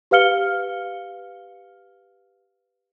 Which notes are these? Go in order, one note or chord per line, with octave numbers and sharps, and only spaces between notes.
G4 B4 F5 F6 C#7 G7